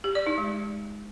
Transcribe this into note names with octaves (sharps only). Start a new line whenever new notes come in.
G4
D5
D#4
G#3